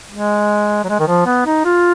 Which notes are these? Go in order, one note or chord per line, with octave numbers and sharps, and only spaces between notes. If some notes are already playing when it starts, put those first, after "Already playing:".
G#3
F#3
G#3
D#3
F3
B3
D#4
F4